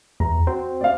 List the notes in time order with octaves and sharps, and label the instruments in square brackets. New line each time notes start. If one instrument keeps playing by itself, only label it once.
[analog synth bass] E2 [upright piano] A#5
[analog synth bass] C4 [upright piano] F#4
[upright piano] D5 F5